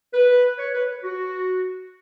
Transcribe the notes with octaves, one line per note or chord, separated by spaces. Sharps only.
B4
C#5
B4
F#4